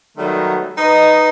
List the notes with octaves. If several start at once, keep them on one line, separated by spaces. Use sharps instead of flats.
D#3 F#3 G3 A3 B3
D#4 B4 D#5